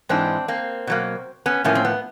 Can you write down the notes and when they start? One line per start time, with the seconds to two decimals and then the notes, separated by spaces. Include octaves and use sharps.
0.09 G#2 E3 G#3 C4 D4
0.48 A#3 C4
0.87 B2 F#3 A#3
1.46 B3 C#4
1.64 A2 F3 A#3 B3 C#4
1.75 C4
1.85 B3